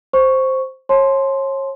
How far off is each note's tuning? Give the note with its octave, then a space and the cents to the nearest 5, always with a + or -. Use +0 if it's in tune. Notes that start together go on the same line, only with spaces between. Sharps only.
C5 +0 C#6 +0
C#5 -35 A5 -35 C6 +0